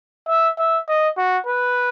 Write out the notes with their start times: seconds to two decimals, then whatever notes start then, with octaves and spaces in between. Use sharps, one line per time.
0.28 E5
0.59 E5
0.88 D#5
1.17 F#4
1.47 B4